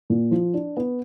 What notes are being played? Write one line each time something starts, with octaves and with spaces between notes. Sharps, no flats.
A#2
F3
D4
B3